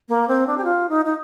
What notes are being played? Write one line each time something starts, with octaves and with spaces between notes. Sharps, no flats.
A#3
C4
D4
G4
F4
D#4
D#4